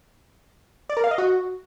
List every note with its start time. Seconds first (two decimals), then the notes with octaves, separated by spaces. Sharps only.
0.90 D5
0.97 A#4
1.04 F5
1.11 D#5
1.18 F#4